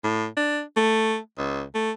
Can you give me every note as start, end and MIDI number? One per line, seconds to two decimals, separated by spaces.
0.04 0.26 45
0.37 0.61 62
0.77 1.18 57
1.38 1.62 37
1.75 1.91 57